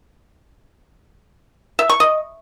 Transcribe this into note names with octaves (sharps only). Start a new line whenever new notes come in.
E5
C#6
D#5